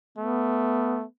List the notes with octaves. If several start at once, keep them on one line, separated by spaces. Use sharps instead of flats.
A3 B3